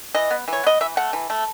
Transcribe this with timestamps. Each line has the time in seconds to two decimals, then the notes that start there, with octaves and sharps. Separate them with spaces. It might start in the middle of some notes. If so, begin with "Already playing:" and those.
0.15 E3 D#5
0.30 B3
0.48 E3
0.53 C#5
0.63 B3 D#5
0.81 E3 E5
0.97 A3 F#5
1.13 E3
1.30 A3